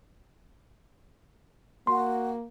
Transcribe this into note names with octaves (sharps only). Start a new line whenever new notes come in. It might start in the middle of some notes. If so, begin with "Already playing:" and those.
A#3 F#4 C6